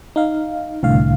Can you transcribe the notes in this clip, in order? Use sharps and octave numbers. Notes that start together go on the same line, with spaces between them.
D#4 F5
C2 A2 D3 F5